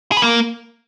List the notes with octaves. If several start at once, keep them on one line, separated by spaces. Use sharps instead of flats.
G#4
B4
A#3